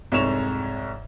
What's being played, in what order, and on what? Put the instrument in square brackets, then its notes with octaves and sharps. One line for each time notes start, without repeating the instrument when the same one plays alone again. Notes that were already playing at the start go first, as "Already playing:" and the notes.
[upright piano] C2 F2 G#2 C#5 E7 F7